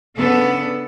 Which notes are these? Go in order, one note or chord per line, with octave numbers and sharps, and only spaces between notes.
C#3 B3 D4 A4